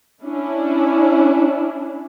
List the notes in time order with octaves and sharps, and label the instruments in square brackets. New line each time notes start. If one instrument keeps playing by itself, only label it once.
[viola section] C#4 D4 E4